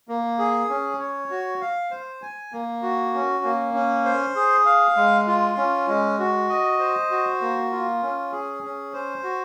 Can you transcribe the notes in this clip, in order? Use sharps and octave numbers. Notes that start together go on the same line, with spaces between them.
A#3
G#4
C#4
C#5
F#4
F5
C5
G#5
A#3
F#4
C#4
A#3
C#4
C5
G#4
F5
G#3
F4
C#4
G#3
F#4
D#5
C5
F#4
A#3
F4
C#4
G#4
C#4
C5
F#4